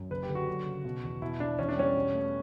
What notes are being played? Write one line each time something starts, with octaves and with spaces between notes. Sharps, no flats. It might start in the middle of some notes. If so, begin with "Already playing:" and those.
Already playing: F#2
F#1 B4
G4
D3
F#4
F#3
C#3
B2
E2
B2 E4
B2 D4
E2 C#4
D4
G3 C#4
B2
A3